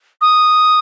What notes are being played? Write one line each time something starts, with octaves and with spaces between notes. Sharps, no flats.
D#6